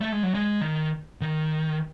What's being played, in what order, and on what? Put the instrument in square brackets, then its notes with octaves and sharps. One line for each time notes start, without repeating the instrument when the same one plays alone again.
[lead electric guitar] A3
G#3
F#3
G#3
D#3
D#3